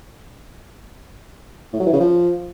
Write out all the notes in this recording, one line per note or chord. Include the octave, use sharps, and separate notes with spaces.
A2
F#3
E3
C#3
F3